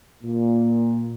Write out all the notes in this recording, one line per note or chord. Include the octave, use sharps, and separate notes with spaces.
A#2